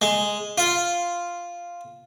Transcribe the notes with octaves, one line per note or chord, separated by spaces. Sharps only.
G#3
F4